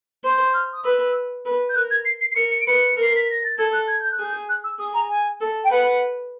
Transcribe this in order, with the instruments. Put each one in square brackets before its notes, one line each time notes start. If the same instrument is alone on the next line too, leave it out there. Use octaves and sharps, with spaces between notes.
[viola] C5
[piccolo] F6
D#6
[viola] B4 [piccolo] E6
[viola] B4
[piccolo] G6
[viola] A#4 [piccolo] F#6
[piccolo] G#6
C7
C7
C7
[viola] A#4 [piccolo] C#7
[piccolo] C#7
D7
[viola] B4 [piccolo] C#7
[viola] A#4
[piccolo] C7
B6
A#6
A6
[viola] A4 [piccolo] G#6
[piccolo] F#6
G#6
G6
F#6
[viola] G#4 [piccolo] G6
[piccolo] F#6
E6
[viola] G#4 [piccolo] D#6
[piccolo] A#5
G#5
[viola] A4
[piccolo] G5
[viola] B4 [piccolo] F#5